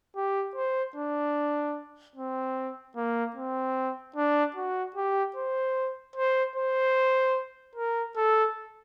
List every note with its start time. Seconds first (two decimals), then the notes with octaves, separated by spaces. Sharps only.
0.16 G4
0.56 C5
0.96 D4
2.16 C4
2.96 A#3
3.36 C4
4.16 D4
4.56 F#4
4.96 G4
5.36 C5
6.16 C5
6.56 C5
7.75 A#4
8.16 A4